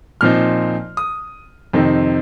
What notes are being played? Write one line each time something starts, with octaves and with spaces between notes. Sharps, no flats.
A#2 F3 C4 D#4 F6
D#6
F2 C3 D#3 C4 D#4